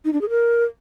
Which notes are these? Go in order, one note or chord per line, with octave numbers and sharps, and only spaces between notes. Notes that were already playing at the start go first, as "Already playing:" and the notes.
D#4
D4
G#4
A#4